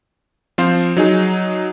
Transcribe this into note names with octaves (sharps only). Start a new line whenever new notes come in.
F3 C4 C5 F5
F#3 D#4 G#4